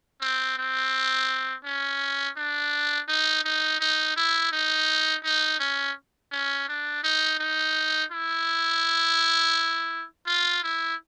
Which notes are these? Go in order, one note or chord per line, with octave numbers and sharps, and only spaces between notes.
C4
C4
C#4
D4
D#4
D#4
D#4
E4
D#4
D#4
C#4
C#4
D4
D#4
D#4
E4
F4
E4